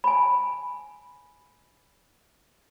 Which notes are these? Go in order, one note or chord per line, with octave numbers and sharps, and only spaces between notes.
G#5 B5